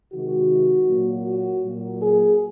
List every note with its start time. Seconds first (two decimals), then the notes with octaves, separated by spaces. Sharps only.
0.13 C3 D#3 G#3 F#4
0.88 A#2 F#3 A#3
1.26 F#4
1.64 A#2 F#3 A#3
2.01 G#4